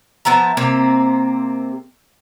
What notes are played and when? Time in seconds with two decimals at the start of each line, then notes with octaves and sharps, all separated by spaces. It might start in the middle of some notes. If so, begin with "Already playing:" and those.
0.25 F3 B3 E5 A#5
0.57 C3 A#3 C4